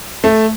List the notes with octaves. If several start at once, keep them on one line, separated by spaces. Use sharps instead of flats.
A3